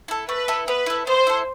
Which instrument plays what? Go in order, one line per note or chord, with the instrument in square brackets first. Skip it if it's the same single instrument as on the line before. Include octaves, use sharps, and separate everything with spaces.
[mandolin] E4 A4
[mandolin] A3 [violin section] B4
[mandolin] E4 A4
[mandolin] B3 [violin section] B4
[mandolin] E4 A4
[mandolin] B3 [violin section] C5
[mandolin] E4 A4